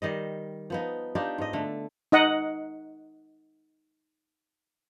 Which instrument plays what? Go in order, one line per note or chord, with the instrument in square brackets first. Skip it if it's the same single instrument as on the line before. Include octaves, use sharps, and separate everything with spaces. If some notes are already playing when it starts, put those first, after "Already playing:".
[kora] D#3 G3 D#5
F3 B3 D#4
D4 D#4 F4 G4
G#2 D#5
D3 A3
[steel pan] D#4 D#5 F#5